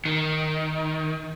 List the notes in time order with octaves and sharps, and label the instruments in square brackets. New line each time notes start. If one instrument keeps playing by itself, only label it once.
[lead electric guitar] D#3